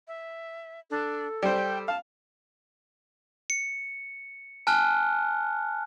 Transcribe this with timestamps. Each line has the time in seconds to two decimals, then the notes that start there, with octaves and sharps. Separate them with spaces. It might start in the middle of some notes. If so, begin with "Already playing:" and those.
0.08 E5
0.91 D4 A4
1.43 G3 C5 G5
1.88 F5 A5
3.50 C#7
4.67 G#5 A5 F6 F#6